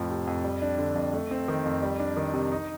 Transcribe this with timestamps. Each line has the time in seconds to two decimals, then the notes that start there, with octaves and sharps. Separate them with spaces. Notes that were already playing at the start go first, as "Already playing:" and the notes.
Already playing: F2 A2 F3
0.10 C3
0.27 F2
0.44 G3
0.62 D4
0.78 D3
0.96 F2
1.13 A3
1.31 C4
1.48 D#3
1.65 F2
1.82 G3
1.99 D4
2.17 D#3
2.34 C3
2.52 D#4